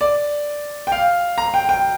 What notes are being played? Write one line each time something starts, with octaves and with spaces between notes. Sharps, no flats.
D5
G5
F5
A#5
G5
G5